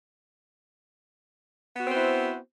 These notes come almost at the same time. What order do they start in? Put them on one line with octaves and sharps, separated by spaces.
B3 F#4 C4 C5 E4